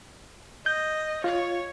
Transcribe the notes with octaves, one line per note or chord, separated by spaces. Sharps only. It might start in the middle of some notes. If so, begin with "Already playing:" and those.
D#5 G6
F4 C#5